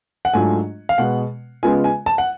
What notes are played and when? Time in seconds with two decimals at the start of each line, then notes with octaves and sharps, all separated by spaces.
0.25 F#5
0.34 G#2 F#3 A3 D4 F4 G#5
0.89 F5
0.98 B2 G#3 B3 F#5
1.63 C#3 G#3 B3 F4 G#5
1.84 G#5
2.06 A5
2.18 F#5